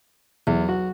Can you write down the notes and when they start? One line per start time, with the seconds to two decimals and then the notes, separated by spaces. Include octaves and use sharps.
0.47 B1 E2
0.69 F#4